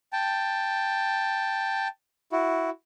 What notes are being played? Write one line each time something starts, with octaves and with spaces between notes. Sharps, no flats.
G5 A5
E4 F#4